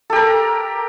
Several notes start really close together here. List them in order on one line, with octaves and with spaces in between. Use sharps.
A4 G4 A#4